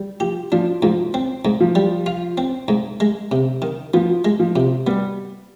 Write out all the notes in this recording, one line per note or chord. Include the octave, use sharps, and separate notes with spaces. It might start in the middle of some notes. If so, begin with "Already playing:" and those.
Already playing: G3
F3 G4
F3 D4
G#2 F3
C4
G#2
F3
G3
F4
C4
G#2
G#3
C3
D#3
F3 B3
G#3
F3
C3
G3 B3